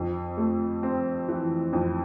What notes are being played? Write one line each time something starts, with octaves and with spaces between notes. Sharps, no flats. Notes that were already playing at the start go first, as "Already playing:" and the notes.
Already playing: F2
A3
C4
E3
F2